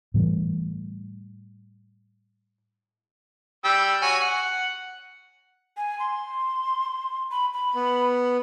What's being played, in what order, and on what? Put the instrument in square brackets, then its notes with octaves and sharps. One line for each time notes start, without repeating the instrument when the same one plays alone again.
[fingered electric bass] A2 E3 G3
[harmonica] G3 G5 E6
F#4 C#5 G#5
F#5
[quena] G#5
C6
B5
B5
[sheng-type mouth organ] B3